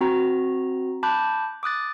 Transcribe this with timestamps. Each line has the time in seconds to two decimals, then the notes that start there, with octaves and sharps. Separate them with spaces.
0.01 C4 F#4 A#5
1.03 A5 B5 D6 F#6 G6
1.63 D6 D#6 F#6 A6